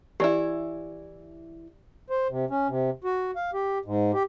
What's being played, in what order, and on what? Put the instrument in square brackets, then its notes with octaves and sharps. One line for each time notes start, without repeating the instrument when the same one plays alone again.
[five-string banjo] E3 E4 [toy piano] G4 D5
[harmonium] C5
C3
C#4
C3
F#4
F5
G4
G#2
G4